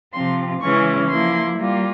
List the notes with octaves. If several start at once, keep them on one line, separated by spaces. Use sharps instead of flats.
C3 F3 C4 F4 C6
C#3 E3 G#3 C#4 E4 C#6
F3 A#3 E4 C6
G3 A#3 F4